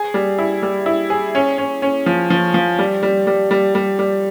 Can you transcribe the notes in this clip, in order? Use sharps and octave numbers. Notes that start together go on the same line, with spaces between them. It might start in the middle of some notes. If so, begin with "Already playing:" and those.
Already playing: G#4
G3
E4
G3
E4
G#4
C#4
C#4
C#4
F3
F3
F3
G3
G3
G3
G3
G3
G3